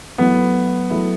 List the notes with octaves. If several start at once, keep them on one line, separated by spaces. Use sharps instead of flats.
F#3 A3 B3 E4
F#3 A3 E4